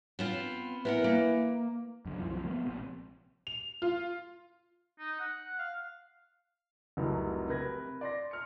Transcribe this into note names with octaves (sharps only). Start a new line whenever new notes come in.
B3 C4 F4
E3 B3 A#4 F#5
A#3
F#2 D3
C2 F#2 E3 F3
F#2 C3 F3
G#3 A#3 B3
A#1 C3
F7
F4
D#4
F#5
F5
F1 C2 F#3
C3 A#4 B4 G#6 A#6
D5 C6 A#6
C6 F6 C#7